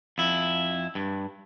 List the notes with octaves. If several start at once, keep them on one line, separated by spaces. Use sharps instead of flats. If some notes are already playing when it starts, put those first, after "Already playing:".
F2 E4
G2